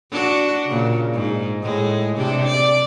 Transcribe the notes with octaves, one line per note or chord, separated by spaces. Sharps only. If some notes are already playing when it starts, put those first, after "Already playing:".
D4 F#4
A#2 C#3
G#2
A2 G#3
C3 D4
D5